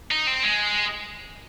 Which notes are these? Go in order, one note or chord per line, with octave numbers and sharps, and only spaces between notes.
D#4
C4
G#3